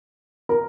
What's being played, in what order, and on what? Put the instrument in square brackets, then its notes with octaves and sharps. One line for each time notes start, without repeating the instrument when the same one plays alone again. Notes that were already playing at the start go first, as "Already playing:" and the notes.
[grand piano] A#4